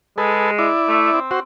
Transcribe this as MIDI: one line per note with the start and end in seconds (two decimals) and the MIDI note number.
0.18 0.68 56
0.18 0.51 68
0.18 0.51 69
0.18 0.51 71
0.59 1.20 64
0.59 1.20 74
0.88 1.12 57
1.13 1.40 60
1.31 1.40 66
1.31 1.40 72